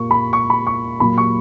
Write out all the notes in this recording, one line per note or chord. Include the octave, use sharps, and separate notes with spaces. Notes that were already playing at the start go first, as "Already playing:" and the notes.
Already playing: A#2 A#3 C#6
B5
C#6
B5
C#6
A#2 F#3 A#3 B5
C#6